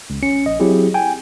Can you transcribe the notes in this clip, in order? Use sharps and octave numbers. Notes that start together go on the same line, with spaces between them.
C#2
G#1 C#4 C#7
A#1 D#5
F#3 C4 E4 G4 G#4
G5 G#5